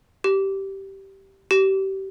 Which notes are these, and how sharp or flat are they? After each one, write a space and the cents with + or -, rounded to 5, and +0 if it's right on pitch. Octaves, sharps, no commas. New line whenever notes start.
G4 -15
G4 -30